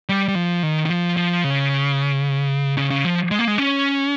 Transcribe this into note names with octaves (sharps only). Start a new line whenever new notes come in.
G3
G3
F3
D#3
D#3
F3
F3
C#3
C#3
C#3
F3
G#3
A#3
G#3
C#4